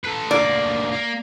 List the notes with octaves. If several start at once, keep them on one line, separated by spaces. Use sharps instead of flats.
A4 B4
D2 A#3 D5
A#3